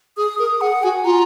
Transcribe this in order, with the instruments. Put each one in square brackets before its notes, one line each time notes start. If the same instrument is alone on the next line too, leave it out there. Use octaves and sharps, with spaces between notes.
[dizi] G#4 [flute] D#6
[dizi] A#4 [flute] D#6
[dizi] G#4 [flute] F#5
[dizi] F#4 [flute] G#5
[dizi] F4 [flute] A#5